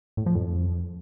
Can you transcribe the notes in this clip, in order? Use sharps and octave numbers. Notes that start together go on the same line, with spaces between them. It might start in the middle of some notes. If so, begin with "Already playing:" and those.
A2
F3
F2